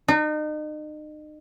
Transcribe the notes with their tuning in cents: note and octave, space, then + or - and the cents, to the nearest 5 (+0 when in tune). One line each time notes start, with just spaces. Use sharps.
D#4 -35